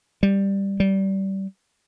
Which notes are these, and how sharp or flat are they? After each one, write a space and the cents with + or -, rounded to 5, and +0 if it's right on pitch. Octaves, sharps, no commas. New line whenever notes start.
G3 +10
G3 -20